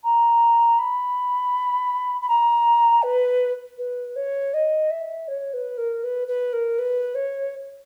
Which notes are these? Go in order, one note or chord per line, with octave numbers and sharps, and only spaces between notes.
A#5
B5
B5
A#5
B4
B4
C#5
D#5
E5
C#5
B4
A#4
B4
B4
A#4
B4
C#5